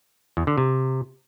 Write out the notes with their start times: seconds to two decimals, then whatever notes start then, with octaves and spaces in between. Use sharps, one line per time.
0.37 E2
0.47 D3
0.58 C3